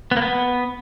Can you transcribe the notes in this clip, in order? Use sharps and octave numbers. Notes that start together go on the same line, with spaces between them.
B3
A#3
B3